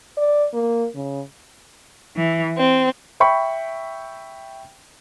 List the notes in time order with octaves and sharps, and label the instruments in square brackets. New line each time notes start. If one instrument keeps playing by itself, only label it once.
[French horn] D5
A#3
C#3
[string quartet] E3
C4
[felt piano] E5 G5 B5 C#6